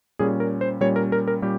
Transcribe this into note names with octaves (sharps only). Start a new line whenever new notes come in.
A#2 G3 C#4 G#4
A#4
C5
A#2 G3 C#4 C#5
A#4
A#4
A#4
A#2 G3 C#4 G4